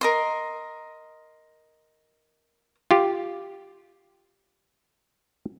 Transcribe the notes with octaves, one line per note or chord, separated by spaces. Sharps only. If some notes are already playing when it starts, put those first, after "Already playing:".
A#4 D#5 C6
F4 G4